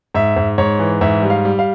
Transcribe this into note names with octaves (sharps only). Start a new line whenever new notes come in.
G#2 E5
G#2
G#2 C#5
E3
G#2 E5
G3
F5
G3
F5